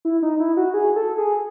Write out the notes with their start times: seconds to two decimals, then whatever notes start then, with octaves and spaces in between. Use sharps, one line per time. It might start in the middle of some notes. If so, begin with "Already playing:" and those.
0.05 E4
0.23 D#4
0.40 E4
0.57 F#4
0.74 G#4
0.96 A4
1.18 G#4